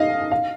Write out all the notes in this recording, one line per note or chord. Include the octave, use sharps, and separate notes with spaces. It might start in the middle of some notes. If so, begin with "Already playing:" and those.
Already playing: D#5 F5
F5